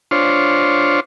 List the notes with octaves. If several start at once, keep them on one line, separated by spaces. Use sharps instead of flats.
D4 F4 C5 C#5